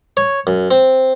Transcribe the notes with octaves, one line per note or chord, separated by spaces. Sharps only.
C#5
F#2
C4